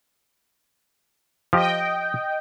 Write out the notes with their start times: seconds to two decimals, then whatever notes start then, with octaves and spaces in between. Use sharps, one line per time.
1.53 F3 G4 D#5 G5